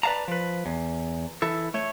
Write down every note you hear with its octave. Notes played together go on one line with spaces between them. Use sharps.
B4 D5 F5 A5 A#5
F3 B4
E2
E3 E4 A4
A3 C#5